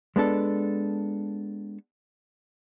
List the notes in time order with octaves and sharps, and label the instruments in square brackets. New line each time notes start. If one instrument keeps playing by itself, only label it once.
[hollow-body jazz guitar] G#3 B3 D4 A4